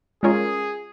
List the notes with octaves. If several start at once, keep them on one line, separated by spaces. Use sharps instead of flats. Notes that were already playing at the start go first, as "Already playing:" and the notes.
G#3 C#4 F4 G#4 A#4 C#5